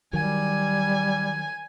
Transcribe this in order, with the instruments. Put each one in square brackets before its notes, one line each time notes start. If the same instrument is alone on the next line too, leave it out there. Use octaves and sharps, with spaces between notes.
[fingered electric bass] D#3 F#3 [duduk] G3 [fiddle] G#5